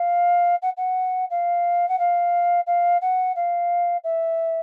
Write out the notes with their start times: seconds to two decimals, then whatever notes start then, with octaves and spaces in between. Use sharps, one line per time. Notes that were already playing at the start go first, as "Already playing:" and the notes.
Already playing: F5
0.62 F#5
0.77 F#5
1.30 F5
1.89 F#5
1.99 F5
2.67 F5
3.02 F#5
3.36 F5
4.04 E5